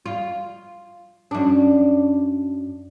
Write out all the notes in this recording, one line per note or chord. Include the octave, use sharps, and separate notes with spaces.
F4
F#2 D4